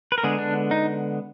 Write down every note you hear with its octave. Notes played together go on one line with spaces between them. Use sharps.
B4
A#4
D3 G#3 B3 G#4
D4
D#4